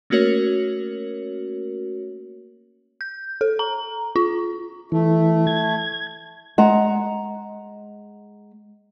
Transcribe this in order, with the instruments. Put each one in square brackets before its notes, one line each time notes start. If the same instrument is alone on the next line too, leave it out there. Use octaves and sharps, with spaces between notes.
[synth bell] A3 A#3 C#4 F#4 A#4 C#5
G6
A4
A#5
F4
[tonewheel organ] E3 [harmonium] A3
[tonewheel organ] G#6
[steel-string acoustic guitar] G#3 F#5 A#5